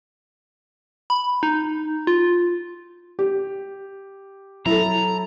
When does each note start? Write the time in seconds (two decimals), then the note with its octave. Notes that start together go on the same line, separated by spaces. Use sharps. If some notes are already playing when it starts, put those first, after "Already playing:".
1.10 B5
1.43 D#4
2.07 F4
3.19 G4
4.66 F#3 E4 A4 A#5